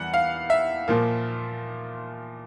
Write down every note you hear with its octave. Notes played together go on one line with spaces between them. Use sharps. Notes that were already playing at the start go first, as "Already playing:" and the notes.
Already playing: E2 G3 F#5
F5
E5
A#2 F3 A#3